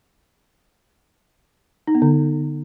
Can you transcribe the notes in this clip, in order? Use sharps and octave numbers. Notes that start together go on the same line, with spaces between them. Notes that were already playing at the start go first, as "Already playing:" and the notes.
D#4
B3
D3